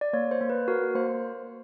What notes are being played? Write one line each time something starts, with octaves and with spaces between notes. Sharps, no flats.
D5
A#3 C#5
C5
A#3
B4
F#4 A#4
A#3 C5